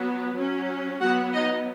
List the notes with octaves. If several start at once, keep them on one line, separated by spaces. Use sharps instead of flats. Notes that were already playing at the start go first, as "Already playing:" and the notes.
Already playing: F#3 B3
F#3 C#4
F#3 B3 F#4 F#5
D#4 D#5